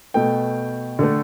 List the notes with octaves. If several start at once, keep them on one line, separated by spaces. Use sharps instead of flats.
B2 A3 G5
D3 A3